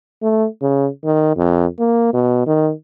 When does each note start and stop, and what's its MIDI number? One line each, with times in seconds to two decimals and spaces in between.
0.22 0.46 57
0.62 0.88 49
1.04 1.33 51
1.36 1.66 41
1.79 2.12 58
2.13 2.42 47
2.47 2.71 51